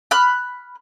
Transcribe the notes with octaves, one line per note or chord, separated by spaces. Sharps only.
B5 F6 F#6